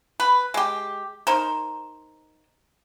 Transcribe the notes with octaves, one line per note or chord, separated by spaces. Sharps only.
B4
G#3 G4
D#4 A#4 C5